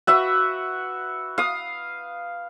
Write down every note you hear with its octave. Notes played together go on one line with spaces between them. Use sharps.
F#4 B4 E5 F#5
F5 D#6